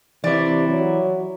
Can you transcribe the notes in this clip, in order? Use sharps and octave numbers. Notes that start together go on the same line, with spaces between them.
C3 E3 E4 D5
F#3